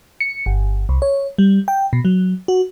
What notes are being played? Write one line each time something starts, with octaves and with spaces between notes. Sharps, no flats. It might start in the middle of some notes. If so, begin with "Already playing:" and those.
C#7
G1
C2
C#5
G3
G5
B2
F#3
F#4